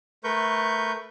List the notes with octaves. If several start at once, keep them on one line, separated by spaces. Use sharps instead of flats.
A3 A#4 B4 C#6 G6